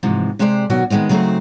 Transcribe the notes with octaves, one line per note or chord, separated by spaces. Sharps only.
G#2 C3 E3 F3
C3 G#3 G4 C5 D5
B2 D#3 F#3 F#4
D#3 F3 G#3 B3 C4
C#3 F#3 A3 C4 D#4 C5